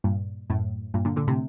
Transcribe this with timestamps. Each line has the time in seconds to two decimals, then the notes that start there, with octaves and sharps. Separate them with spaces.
0.04 G2 A#2
0.50 F#2 A2
0.94 G2 A#2
1.05 A#2 D3
1.16 A#2 D3
1.27 A2 C3